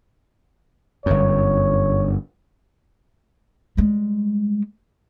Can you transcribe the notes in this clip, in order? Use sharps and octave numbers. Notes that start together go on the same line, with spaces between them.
G1 F#2 C#5
G3 G#3